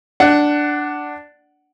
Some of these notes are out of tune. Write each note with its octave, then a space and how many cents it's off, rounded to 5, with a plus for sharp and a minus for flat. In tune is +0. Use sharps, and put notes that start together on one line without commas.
D4 +0 F#5 +15